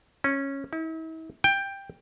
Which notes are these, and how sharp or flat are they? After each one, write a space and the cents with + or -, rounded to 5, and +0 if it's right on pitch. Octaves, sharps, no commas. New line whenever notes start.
C#4 -10
E4 -40
G5 +10